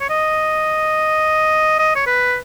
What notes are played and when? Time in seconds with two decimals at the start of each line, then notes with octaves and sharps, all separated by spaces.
0.01 C#5
0.10 D#5
1.79 D#5
1.96 C#5
2.07 B4